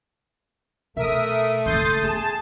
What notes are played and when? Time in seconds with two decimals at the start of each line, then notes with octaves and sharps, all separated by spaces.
0.97 B2 A3 A#4 E5 D#6
1.66 F#1 G#3 C6 D#6 G6 A6
2.04 B3 G#4 A5